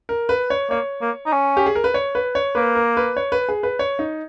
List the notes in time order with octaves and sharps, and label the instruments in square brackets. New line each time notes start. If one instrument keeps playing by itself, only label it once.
[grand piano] A#4
B4
C#5
[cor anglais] A#3 [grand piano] C#5
[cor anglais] A#3
D#4
C#4
[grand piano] G4
G#4
A#4
B4
C#5
B4
C#5
[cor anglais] A#3 [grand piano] B4
[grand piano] A#4
B4
C#5
B4
G#4
B4
C#5
D#4